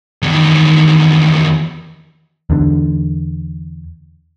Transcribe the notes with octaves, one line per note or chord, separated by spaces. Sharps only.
E2 D#3
E2 D3